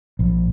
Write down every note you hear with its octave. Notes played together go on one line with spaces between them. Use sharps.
A#1